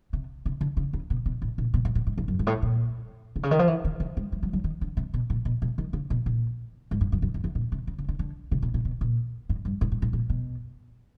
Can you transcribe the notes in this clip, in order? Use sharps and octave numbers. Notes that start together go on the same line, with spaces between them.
C3
C3
D3
C#3
C#3
B2
B2
A2
A#2
B2
A#2
A2
G#2
F2
F#2
G2
A2
A#2
C3
C#3
D#3
F3
E3
D#3
D#3
G#3
G3
F#3
F#3
D#3
D3
C3
B2
A#2
B2
B2
D#3
C#3
B2
A#2
G#2
G2
F#2
F#2
F2
E2
A#2
C3
C#3
C#3
D3
D3
C3
B2
B2
B2
A#2
G#2
G2
G#2
A2
A#2
A#2
B2